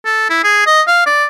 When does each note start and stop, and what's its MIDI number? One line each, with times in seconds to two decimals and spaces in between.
0.05 0.28 69
0.30 0.39 64
0.44 0.62 68
0.66 0.82 75
0.87 1.03 77
1.06 1.26 74